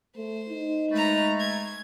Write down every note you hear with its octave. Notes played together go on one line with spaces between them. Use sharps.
A3 C5
D#4
G#3 A3 B4 A#5
G#6